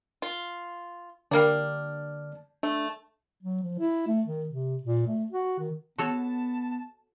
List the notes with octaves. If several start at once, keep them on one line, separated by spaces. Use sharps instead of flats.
F4
D3 G3 A#3 D4 D5 F6
A3 D4
F#3
F3
E4
A3
D#3
C3
A#2
A3
F#4
D#3
B3 F#4 A4 C#5 A5